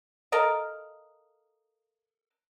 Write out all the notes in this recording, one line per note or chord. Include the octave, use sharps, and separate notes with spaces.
A4 A#4 D#5 F5